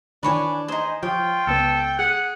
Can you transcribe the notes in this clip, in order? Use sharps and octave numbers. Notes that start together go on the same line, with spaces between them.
D#3 E3 D4 B4 C#5 G#5
D#4 G#4 C5
F3 F4 C#5 G5
C#2 B3 A4
G#4 F#5